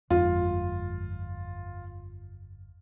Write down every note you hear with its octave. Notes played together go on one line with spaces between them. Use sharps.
G1 F2 G#3 F4